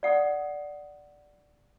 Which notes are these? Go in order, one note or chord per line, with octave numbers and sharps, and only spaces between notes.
D5 F#5 D#6